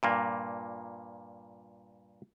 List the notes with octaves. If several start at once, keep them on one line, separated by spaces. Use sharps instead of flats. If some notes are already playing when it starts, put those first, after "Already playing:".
G2 A#2 A#3